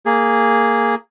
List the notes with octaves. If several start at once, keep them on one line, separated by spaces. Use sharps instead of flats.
A#3 G#4